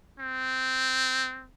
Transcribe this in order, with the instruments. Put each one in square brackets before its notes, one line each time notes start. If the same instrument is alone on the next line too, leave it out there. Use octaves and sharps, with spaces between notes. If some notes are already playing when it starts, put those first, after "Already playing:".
[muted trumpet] C4